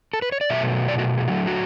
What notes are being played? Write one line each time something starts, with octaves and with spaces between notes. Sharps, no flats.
A4
B4
C#5
D5
B2 F#3 A3 E5
D5
F#4
G#4
D3 F#3 A3 F#4
F#4